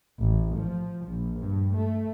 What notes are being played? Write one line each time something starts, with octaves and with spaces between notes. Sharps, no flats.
A1
F3
A#1
G2
A3